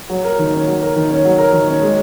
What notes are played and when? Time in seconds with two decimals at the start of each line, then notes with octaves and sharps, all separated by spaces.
0.10 F#3
0.25 A#4
0.39 D#3
0.53 C#4
0.67 F#3
0.81 A#4
0.96 D#3
1.10 C#4
1.25 F#3
1.38 A#4
1.53 D#3
1.68 C#4
1.82 G#3